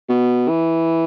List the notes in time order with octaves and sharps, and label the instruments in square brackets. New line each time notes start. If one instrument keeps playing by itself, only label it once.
[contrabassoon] B2
E3